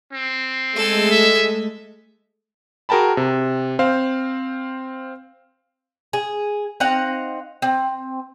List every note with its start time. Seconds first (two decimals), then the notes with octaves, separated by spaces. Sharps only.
0.13 C4
0.76 G#3 A3 A4 G#5
1.11 E5
2.89 F#4 G#4 A#4 G5 A5 B5
3.17 C3
3.79 C4 C5 F5
6.13 G#4
6.80 C4 D#4 F5 F#5
7.62 C4